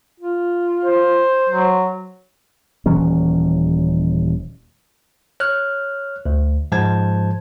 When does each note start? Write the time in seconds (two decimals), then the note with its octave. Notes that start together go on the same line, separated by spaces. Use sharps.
0.20 F4
0.85 C5
1.49 F#3
2.86 D#1 E3 F#3 C#4
5.40 C#5 F6 F#6
6.26 D2
6.72 G#2 F3 G#3 C5 A5 G#6